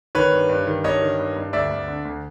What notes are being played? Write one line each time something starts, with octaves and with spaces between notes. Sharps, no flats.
D#3 B4 C#5
G2
G2
D#3
G2 C#5 D#5
D#3
G2
G2
D2 D5 E5
D2
D3
D2